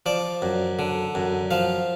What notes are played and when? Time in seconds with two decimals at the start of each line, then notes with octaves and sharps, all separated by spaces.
0.06 F3 D5
0.42 F#2
0.79 D3
1.15 F#2
1.51 F3 F5